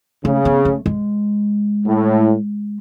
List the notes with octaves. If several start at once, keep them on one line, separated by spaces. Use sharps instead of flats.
C#3 A3
B3
A3
G#3
A2